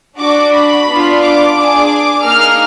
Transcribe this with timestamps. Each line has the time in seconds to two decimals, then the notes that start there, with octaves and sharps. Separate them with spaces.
0.18 D4 F#4 D6
0.53 B5
0.87 B3 D4 F4
1.21 D6
1.55 D4 G#4
2.23 A#3 D#4 G#4 F6